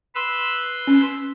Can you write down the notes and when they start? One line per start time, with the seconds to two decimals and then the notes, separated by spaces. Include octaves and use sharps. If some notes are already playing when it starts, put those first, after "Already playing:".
0.15 B4 C6 E6
0.87 C#4